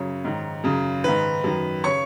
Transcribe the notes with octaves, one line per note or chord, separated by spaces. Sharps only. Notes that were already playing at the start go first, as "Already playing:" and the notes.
Already playing: F#2 C#3 C#5
G#2 D#3
F#2 C#3
G#2 D#3 B4
F#2 D#3
C#3 C#5 C#6